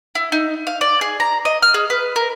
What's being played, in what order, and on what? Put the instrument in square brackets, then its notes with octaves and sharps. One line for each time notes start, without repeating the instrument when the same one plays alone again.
[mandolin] E4
D#4
F5
D5
G#4
A#5
D#5
F6
G#4
B4
A#4